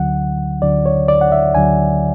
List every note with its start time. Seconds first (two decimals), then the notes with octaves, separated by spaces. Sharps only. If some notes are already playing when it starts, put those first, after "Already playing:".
Already playing: D2 D3 F#3 F#5
0.62 D2 D3 F#3 D5
0.86 C#5
1.08 D5
1.21 F#5
1.32 E5
1.55 D2 D3 F#3 G#5